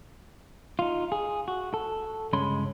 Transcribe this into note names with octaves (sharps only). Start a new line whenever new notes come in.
D#4 F4
G#4
F#4
A4
C#2 G2 G#3 C#4 B5 C6